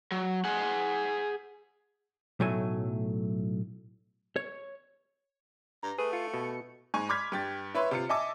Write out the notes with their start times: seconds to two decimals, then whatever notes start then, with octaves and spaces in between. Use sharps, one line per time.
0.12 F#3
0.45 G#4 F#5
2.40 B1 A2 F#3 A3 G#5
4.36 C#5
5.83 G2 A#5
5.99 A3 G#4 B4
6.13 F4 C#7
6.34 B2
6.94 G#2 G#5 C#6
7.09 B5 C6 D6 F6 G#6 B6
7.32 G2 G5 A6
7.75 E4 B4 C#5 E5 C6
7.91 C3 F4 C#7
8.09 D#5 E5 G#5 A5 D6 E6